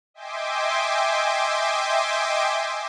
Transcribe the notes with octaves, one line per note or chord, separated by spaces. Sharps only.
D#5 E5 G5 G#5 C6 D6